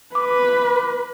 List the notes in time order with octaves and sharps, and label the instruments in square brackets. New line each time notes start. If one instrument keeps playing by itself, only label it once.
[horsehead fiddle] B4 [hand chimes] D6